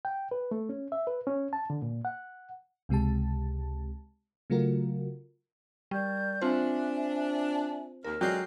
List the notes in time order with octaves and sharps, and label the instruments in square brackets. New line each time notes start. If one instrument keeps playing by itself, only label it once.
[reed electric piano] G5
B4
A3
C#4
E5
B4
C#4
A5
D3
A#2
F#5
[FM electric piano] C#2 C3 G#3 G4 A5
C#3 F#3 A3 F4 F#4 A#4
[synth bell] G3 [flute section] A#4 D5 G6
[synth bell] C4 F4 C5 [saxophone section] D4 [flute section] E5 G#5
[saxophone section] D#2 [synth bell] A#4 [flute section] F6
[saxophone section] D3 G#3 D5 [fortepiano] F#3 [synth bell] G5 G6 C7